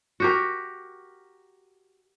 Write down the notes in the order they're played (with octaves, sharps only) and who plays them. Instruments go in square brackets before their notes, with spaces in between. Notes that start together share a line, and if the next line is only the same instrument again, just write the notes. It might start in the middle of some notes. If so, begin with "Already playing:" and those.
[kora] F#4 G4 A#4